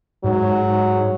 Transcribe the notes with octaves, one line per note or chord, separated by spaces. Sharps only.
G#2 F#3